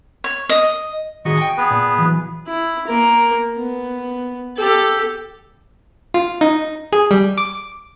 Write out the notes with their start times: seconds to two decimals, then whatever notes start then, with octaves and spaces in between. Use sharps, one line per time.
0.24 C#5
0.49 D#5
1.25 D#3 F#4 G#4 D#5 C#6
1.37 G5 G#5
1.57 B3 G#4 B4
1.71 A#2
1.98 E3 F#3
2.47 E4
2.87 A#3 A#4
3.58 B3
4.57 G4 A4
6.14 F4
6.41 D#4
6.93 G#4
7.11 G3
7.38 D6